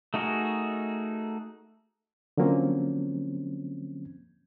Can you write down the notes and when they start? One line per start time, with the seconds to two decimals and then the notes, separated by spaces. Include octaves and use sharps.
0.14 A3 D#4 F#4 G#4 A#4
2.38 D3 F3 F#3 A#3 C4 C#4